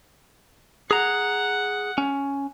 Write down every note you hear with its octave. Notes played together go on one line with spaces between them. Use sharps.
G#4 F#5 A#5
C#4